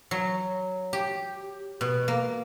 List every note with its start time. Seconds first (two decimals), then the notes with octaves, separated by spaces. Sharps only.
0.11 F#3
0.93 G4
1.81 B2
2.08 A#3